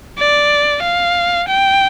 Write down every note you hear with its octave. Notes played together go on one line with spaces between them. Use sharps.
D5
F5
G5